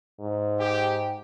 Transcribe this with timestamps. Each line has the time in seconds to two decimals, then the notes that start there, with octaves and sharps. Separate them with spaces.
0.20 G#2
0.59 G4